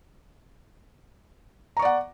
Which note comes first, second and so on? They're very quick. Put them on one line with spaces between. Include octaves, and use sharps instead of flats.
A#5 C#6 D5 F#5